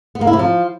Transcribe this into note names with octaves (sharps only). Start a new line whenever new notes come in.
B3
A#3
E4
C3
F3